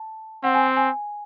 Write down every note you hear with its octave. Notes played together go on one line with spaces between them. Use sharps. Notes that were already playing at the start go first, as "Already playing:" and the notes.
Already playing: A5
C4 F#5
G#5
G5
G#5